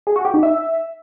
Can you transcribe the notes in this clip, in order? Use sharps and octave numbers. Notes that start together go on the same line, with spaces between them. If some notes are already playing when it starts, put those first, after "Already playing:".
G#4
F#4
G4
D#4
E5